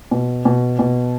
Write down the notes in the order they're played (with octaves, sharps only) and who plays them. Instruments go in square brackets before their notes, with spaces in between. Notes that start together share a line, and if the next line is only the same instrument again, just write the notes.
[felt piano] B2
B2
B2